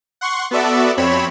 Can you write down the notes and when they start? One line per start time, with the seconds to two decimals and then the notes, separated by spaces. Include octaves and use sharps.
0.21 F#5 C6 C#6
0.51 B3 F#4 A4 D5 E5
0.97 F2 C4 C#5 B5 E7